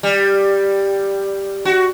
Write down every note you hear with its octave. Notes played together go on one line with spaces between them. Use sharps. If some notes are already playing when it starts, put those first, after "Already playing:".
G3
F#4